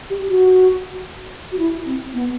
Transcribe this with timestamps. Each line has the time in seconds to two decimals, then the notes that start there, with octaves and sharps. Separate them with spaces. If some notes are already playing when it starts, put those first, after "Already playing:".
0.10 G4
0.29 F#4
1.52 F#4
1.59 E4
1.86 C4
2.14 B3